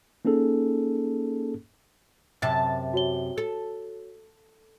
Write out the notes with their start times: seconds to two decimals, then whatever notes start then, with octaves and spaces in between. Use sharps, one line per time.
0.25 A#3 C#4 D#4 G#4 A4
2.42 F#2 C3 A5
2.94 F#4 C#5 G7
3.38 A4